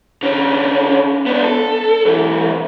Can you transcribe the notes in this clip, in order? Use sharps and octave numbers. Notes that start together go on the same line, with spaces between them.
D3 C#4
B3 D4
A4
B1 E3